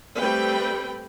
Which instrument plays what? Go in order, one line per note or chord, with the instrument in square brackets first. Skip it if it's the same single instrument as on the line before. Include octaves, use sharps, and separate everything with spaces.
[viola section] G3 A3 C4 B4 G5 B5